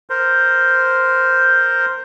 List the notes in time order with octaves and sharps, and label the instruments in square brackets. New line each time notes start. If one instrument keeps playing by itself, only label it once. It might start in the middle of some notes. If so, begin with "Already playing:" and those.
[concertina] A#4 C5